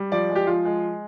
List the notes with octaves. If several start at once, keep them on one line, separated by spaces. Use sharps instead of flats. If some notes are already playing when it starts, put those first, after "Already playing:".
Already playing: G3
F3 D5
G#3
G4
F3 F4
G#3